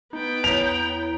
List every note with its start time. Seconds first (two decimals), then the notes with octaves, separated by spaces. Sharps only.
0.13 B3 D#4 G5
0.44 E2 E4 C#5 A#5 F7